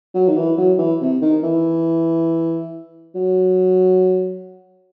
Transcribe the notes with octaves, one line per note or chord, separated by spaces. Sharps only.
F#3
D#3
E3
F#3
E3
C3
D#3
E3
F#3